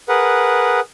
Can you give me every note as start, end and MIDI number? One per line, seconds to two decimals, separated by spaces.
0.09 0.80 68
0.09 0.80 70
0.09 0.80 71
0.09 0.80 78